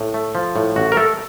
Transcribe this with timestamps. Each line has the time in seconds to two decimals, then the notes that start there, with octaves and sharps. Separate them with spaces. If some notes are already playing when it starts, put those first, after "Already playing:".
Already playing: A2
0.14 A3
0.35 F3
0.56 A2
0.76 A1 F#4
0.92 A#4
0.97 A3 A4